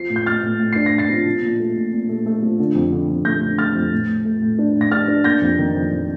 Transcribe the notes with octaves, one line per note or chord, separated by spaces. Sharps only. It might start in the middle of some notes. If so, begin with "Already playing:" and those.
Already playing: F3 C7
A2
G6
A2 F6 A6
A2
A2
D4 C7
A#6
A2
A6 C7
F3
F3
A#2
A3
A#2
A#2
A3
A3
F3
D3
F2
D3
F2
A3 G6 A#6
D3
A3 F6 A6
F2
A2
A2
A3
A2
D4
A2
A#6
D4 F6 A6
D4
A#3 G6 A#6
F2
D#3
F2
F2